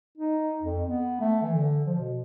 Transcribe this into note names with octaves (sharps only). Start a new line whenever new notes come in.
D#4
F2
B3
A3
E3
D3
F3
B2